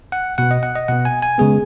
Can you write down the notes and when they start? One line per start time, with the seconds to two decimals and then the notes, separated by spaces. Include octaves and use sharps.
0.12 F#5
0.38 B2 B3 F#5
0.51 D#5
0.63 F#5
0.76 D#5
0.88 B2 B3 F#5
1.05 G#5
1.22 G#5
1.38 C#3 G#3 B3 G#4